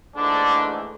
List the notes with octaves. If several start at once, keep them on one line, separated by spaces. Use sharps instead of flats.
A#1 G#2 D3 E3 A3 D4